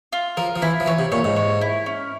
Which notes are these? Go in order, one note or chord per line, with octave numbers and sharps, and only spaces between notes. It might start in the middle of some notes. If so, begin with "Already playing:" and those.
F4
F3 A#4
F3
E3 E4
F3
E3 C#5
C3
A#2 C#5
G#2
C#5
E4
C#4